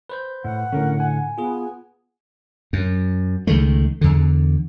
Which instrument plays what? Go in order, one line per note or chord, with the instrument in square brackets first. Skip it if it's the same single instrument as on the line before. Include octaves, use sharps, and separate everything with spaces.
[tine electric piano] B4 C5 G6
[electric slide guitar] A2 [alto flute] F#5
[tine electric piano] A2 D3 [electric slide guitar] C#4 A#4
[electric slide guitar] G#5
[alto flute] B3 [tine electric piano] F4 G#4
[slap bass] F#2
C#2 D#3 G#3 A3
E2 D3